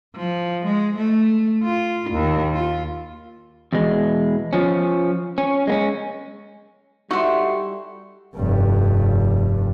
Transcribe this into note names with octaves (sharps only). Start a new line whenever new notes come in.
F3
G#3
A3
F4
D#2
F4
E2 B2 G#3
F3 C#4
C#4
G#3 A#3 C#4
G3 A3 D#4 E4 F#4 C6 C#6
F1 G2